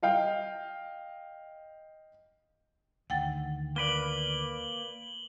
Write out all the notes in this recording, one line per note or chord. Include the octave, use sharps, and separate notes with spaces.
D#5 F5 G5
D2 D#3 F#5 G5 A6
A#3 B4 D5 F#7 G7